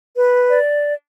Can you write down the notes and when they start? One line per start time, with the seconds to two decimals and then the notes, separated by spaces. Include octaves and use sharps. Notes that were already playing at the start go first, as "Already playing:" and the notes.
0.17 B4
0.51 D5